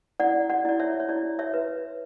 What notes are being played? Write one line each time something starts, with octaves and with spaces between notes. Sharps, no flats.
E4 D5 F#5
D5 F#5
E4 D5
C#5 E5
C#5
E4 D5
C#5 E5
B4